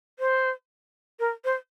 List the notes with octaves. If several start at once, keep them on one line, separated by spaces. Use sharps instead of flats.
C5
A#4
C5